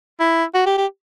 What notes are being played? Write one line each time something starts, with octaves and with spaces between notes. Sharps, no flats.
E4
F#4
G4
G4